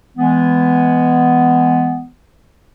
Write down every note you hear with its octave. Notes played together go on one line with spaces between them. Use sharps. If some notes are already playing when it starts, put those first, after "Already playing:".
E3 G#3 B3